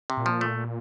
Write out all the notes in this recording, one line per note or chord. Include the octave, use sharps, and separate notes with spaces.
C3
A#2
F3
A3